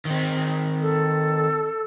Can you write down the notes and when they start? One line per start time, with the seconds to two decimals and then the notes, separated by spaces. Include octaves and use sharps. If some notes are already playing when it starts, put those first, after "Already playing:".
0.05 D#3 C4
0.81 A4